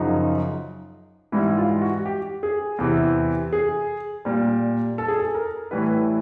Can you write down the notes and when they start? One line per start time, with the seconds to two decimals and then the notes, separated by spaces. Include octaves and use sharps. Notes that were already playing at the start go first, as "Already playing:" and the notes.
Already playing: F#2 C#3 F3 D#4
1.32 G#2 E3 G3 E4
1.58 F4
1.81 F#4
2.05 G4
2.43 G#4
2.78 E2 C3 E3
3.53 G#4
4.25 A#2 G3
4.98 A4
5.08 G#4
5.19 A4
5.34 A#4
5.71 A2 E3 G3 B4